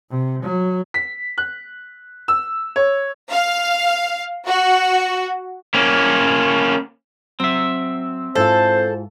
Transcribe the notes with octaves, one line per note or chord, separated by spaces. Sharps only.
C3
F#3
B6
F#6
E6
C#5
F5
F#4
A#3 C#4
F#3 C4 E5
G#2 E4 F4 A4 C5